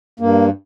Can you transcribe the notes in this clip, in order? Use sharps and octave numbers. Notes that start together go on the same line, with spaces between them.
G2 A#3